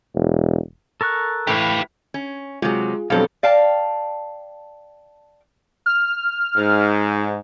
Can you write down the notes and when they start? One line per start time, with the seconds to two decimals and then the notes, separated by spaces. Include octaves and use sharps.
0.15 E1
1.01 A4 A#4 C#6 F#6 A6
1.47 A2 E3 G4 F5
2.14 C#4
2.62 C3 F#3 G#3 F4 G#4
3.10 F2 B2 F#3 G3 C4 D4 A4 F5
3.43 D5 F5 G5 A5
5.86 F6
6.56 G#2